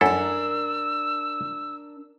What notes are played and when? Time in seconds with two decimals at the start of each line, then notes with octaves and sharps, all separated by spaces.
0.01 F#2 D4 E4 A4 A#4 E6